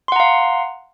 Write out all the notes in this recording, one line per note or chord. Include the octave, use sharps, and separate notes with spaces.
F5 F#5 A#5 C6